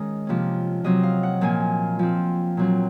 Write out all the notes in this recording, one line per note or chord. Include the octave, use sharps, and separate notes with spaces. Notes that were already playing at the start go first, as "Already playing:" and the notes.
Already playing: D#3 G#3 C#4 D#5
C3 F3 A#3 C#4
C3 F#3 C4 D#5
F5
F#5
A#2 F3 A#3 G#5
F3 C4
A#2 F#3 C4